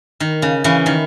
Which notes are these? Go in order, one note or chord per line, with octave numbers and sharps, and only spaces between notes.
D#3
C#3
C#3 E3
D#3